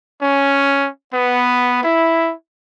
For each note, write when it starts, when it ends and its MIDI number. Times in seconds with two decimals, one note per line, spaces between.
0.22 0.89 61
1.14 1.81 59
1.84 2.33 64